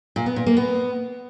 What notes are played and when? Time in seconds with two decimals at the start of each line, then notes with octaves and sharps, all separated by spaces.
0.16 A#2
0.26 B3
0.36 A#2
0.47 A#3
0.57 B3